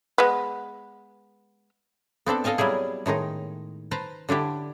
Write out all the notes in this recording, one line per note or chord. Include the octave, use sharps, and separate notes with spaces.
G#3 B3
B3 C4 D4 A4
A4 D#5 F5 G#5 A5
F#3 G3 E4 G#4
A2 D#3 G#3 D#4
B4 C5 A5 A#5
D3 D4 E4 G4